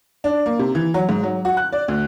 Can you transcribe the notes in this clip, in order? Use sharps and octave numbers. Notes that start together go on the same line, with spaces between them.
D4
A#3
C3
E3
F#3
G#2
F#3
F#4
F#6
D5
D2